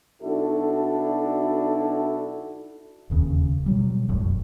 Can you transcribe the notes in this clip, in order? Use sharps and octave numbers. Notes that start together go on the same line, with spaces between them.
B1 D4 E4 F#4 A4
E1 D#2 C#3
B2 F#3 G3
F1 B1 F#2 A2